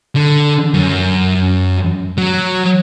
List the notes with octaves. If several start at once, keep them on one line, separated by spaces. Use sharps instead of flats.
D3
F#2
F#3